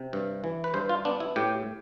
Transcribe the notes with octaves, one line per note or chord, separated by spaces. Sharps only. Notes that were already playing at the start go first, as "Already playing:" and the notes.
Already playing: C3
G2
E3
B4
G2 C5
F4
B3 D4
E4
A2 G4